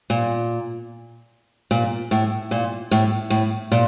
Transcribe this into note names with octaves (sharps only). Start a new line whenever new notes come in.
A#2
A#2
A2
A#2
A2
A2
A#2